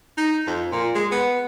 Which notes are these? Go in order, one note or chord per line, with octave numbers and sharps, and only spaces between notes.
D#4
F2
A#2
G#3
B3